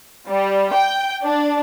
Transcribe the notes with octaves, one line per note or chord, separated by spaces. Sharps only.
G3
G5
D4